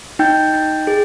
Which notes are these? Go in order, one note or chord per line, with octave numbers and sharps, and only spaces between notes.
D#4 G5 G6
D#4
G#4